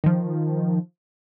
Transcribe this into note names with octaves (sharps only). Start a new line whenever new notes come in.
D#3 F3